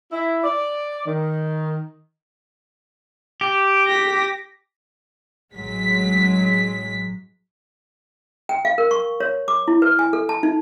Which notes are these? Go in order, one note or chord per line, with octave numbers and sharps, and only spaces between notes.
E4
D5
D#3
G4
A#6 B6
A1 F#3 G#3 B6
G5
F5
A#4
C#6
C#5
D6
E4
B4
G#5
A4
A5
D#4